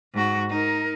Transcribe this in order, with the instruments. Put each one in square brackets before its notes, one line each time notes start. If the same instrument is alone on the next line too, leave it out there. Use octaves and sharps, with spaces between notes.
[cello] G#2 F#4
D#4 A#4